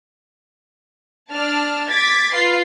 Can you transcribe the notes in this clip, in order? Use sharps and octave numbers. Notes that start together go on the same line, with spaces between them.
D4 D5 A5 F6
D6 G#6 A6 B6
F4 B4 C7